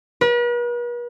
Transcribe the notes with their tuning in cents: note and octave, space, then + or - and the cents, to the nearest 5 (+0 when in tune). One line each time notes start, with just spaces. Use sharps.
B4 -45